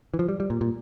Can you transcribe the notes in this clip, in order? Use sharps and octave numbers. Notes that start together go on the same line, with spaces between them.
E3
F3
G3
G3
A#2
A#2